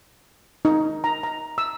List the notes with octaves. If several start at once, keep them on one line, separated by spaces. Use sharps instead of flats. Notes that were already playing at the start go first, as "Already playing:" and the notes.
D#4
A#5
A#5
E6